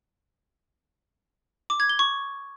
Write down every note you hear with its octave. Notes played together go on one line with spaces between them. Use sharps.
D6
G#6
G7
C#6